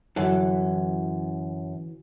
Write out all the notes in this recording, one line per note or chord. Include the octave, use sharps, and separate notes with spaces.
F#2 D3 E3 E4 F#4 A4